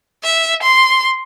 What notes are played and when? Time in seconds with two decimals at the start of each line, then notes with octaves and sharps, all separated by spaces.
0.23 E5
0.63 C6